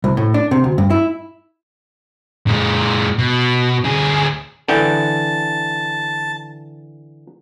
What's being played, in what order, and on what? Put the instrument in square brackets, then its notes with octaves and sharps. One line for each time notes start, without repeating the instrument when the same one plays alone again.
[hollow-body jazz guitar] C2
A2
D4
C3
D2
G2
E4
[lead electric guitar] A#2 G#3
B2
D2 G#4
[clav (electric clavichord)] D3 E3 G5 [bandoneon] A5